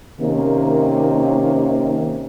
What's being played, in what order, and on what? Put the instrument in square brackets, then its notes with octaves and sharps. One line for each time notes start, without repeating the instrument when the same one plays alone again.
[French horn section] C3 D#3 A#3 C#4